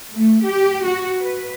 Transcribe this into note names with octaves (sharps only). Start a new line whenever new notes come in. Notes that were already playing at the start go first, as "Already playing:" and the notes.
A3
G4
F#4
B4